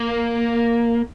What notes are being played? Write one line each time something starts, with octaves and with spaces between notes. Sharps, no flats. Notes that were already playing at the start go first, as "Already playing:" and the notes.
Already playing: A#3